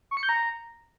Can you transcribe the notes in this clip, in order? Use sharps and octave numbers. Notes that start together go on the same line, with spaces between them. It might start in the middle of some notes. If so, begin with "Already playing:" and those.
C#6
C#7
G6
A#5